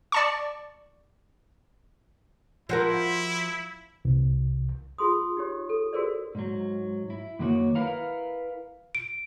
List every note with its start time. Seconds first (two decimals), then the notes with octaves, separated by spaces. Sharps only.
0.12 D5 A5 C#6
2.69 F3 E4 F#4 A#4
4.05 C2
4.98 F4 G#4 C6 D#6
5.37 D#4 G4 C#5
5.69 A4
5.93 F#4 G#4 A#4 C5 D5
6.35 G#2 F#3
7.10 E4
7.39 F#2 D#3 A#3 F#4 C#5
7.75 E4 A#4 B4 F5 F#5 A#5
8.95 D7